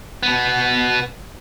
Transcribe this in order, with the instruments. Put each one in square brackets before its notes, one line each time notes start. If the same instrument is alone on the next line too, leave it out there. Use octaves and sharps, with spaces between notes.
[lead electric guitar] B2 B3